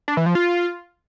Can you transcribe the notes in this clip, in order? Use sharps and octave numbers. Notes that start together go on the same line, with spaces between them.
D4
E3
F3
F4